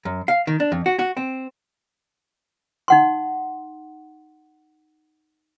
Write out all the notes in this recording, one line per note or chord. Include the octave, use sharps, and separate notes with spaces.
F#2
F5
D#3
D4
F2
F#4
F#4
C4
D#4 F#5 C6